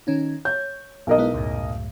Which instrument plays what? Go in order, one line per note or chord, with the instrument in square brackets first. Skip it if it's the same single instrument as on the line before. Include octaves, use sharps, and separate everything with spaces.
[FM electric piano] D#3 C#4 D#4
[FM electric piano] C#5 [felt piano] G6
[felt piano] B1 A#4 D#5
[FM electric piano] G#3 B3 E4
C#2 F#2 A2